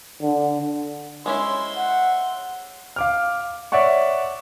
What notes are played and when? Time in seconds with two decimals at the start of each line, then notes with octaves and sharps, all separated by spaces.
0.22 D3
1.26 G#3 C#4 E4 C5 E5 C6
1.77 F#5
2.96 F5 D6 F6
3.72 C#5 D5 E5 F#5 C#6